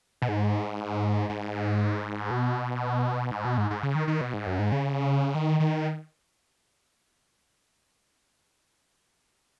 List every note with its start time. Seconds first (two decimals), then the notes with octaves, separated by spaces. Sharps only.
0.22 B2
0.29 G#2
1.29 G#2
2.31 B2
3.31 G#2
3.45 B2
3.58 G#2
3.70 G#2
3.83 C#3
3.95 D#3
4.07 D#3
4.21 B2
4.34 G#2
4.47 F#2
4.59 G#2
4.72 C#3
5.35 D#3
5.60 D#3